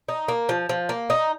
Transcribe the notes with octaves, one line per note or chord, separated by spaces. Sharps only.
D#4
A#3
F3
F3
A#3
D#4